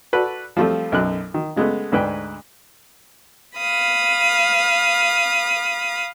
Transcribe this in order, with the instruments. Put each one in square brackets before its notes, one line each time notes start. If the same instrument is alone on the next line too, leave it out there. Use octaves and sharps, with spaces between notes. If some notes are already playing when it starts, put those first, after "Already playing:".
[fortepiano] F#4 A4 B4 D5
F3 G3 A3 C4 F4
B1 F#2 A4 F#6
D#3
C#3 G#3 A3 B3
D2 G#2 B4 G5
[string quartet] F5 B5 D#6